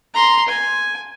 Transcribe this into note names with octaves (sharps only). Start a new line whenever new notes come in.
A#5 C6
G#5